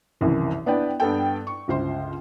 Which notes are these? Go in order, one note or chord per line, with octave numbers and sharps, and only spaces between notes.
F#1 C2 F#2 D#3 E3
B3 D4 E4 B4 D5 G5
G2 B3 A4 G5
C#6
G1 C#2 F4 C5 C6